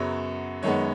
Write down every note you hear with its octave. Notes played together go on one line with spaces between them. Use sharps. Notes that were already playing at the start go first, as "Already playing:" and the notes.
Already playing: F#2 C#3 F#3 B3 C#5
F#2 D#3 G#3 B3 C#5